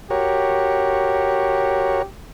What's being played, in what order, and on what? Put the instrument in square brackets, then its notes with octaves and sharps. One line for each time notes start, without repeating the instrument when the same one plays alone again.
[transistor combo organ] F#4 A#4 C#5 [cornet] G4